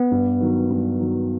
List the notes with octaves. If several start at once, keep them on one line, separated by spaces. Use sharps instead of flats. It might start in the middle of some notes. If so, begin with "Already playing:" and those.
Already playing: B3
G2
D#3 F#3
G2
D#3 F#3